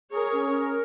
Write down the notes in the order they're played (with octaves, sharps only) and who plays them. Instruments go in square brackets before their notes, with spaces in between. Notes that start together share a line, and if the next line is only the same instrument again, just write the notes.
[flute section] G#4 [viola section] A#4 C#5
[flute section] C#4
A#4